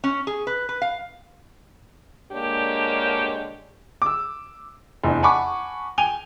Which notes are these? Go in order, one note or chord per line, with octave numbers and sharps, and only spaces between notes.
C#4
G#4
B4
B4
F5
D3 G#3 A#3 D4 G4 C#5
D6 E6
F1 E2 D4
F#5 G#5 A5 B5 C#6 D6
G5 G#5 D#7 F7 G7